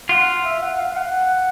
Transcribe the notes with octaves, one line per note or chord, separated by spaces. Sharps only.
F4 F#5
E5
F#5
F5
F#5